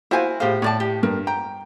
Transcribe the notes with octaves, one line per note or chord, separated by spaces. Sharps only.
E4 F#4 C5 E5 F5 G#5
A2 G4 G#4 C5 F5
A2 C#5 D5 A5
G4
G2 A#4
G5 A#5